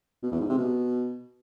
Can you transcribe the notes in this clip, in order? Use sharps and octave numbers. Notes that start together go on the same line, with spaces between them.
B2
E2
G#2
C3
B2